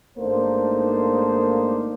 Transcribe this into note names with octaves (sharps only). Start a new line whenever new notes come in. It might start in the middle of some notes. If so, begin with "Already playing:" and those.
G#1 A3 A#3 D4 D#4 C5